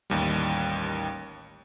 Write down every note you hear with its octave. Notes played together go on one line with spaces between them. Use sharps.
A1 D#2 G3